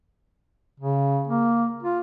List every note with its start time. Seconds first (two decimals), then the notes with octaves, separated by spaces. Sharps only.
0.80 C#3
1.27 A#3
1.83 F4